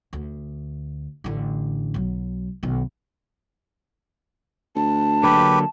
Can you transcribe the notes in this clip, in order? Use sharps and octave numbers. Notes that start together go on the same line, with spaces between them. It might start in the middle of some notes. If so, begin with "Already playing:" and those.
D2
A1 D3
B1 F#3
B1 D#3
D2 A5
D3 F#3 A#3 G4 B4